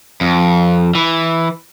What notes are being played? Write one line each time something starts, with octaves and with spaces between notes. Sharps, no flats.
F2
E3